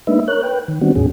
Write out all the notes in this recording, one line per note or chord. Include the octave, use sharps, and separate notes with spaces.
G#3 A#3 D4 D#4 B4 E5
A#4 C#5 F#6
B4 G5
D#3
D#3 G3 B3 C4 D4 F#4
E2 A2 C#4 G#4